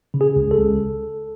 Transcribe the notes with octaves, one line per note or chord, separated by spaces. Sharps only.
C#3
G#4
C#2
A4
C#2